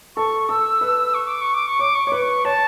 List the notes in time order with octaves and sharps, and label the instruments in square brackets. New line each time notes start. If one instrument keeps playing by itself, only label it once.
[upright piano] A4 [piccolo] C#6
[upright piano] A4 [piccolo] E6
[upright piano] B4
[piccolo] C#6
D6
C#6
D6
C#6
[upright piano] C#5 [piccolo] D6
[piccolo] C#6
[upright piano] B4 C#5 [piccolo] D6
[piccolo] C#6
[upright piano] C#5 [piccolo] A5